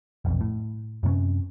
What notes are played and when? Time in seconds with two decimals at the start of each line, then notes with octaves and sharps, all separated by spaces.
0.25 F1 B1 F2
0.41 A2
1.03 F#2 C3 B3 C#4